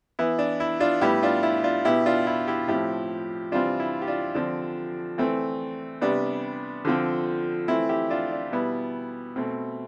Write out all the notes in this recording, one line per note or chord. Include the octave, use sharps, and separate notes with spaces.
E3 B3 E4
D4
E4
D4 F4
A2 G3 B3 E4 G4
D4 F4
E4
D4 F4
B2 B3 E4 G4
D4 F4
E4
E4 G4
A2 F3 C4 E4 G4
C3 E3 G3 C4 D4 F4
E4
G4
D4 F4
D3 F3 C4 D4
E3 A3 C4
C3 G3 B3 D4
D3 F3 C4
E3 A3 C4 E4
E4 G4
D4 F4
D4
B2 G3 B3 E4
B2 A3 C4